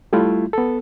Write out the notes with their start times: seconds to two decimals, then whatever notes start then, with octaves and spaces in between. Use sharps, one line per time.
0.13 G3 A3 E4 F4
0.53 B3 A4